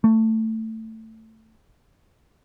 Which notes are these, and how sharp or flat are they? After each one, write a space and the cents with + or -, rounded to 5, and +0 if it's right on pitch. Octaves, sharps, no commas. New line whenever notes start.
A3 +15